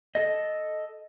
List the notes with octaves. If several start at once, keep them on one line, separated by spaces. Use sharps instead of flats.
A4 D#5